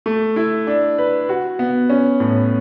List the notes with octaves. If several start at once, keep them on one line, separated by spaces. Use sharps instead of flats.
A3
E4
D4
B4
F#4
B3
C#4
A2